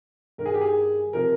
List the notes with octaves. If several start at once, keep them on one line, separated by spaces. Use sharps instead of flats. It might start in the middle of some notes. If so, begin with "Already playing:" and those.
G2 D#3 A#4
G#4
G4
G#4
C3 F3 A#4